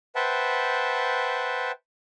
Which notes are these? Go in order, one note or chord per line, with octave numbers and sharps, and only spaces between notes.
B4 C5 E5 F#5 G5 A5